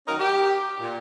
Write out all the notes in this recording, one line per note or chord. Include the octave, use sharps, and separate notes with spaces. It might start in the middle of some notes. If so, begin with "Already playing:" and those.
D#3 F#3 C#4 D#4 F4 A#4
G4
A#2